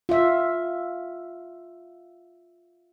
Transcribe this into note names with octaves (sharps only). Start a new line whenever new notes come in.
F4 E5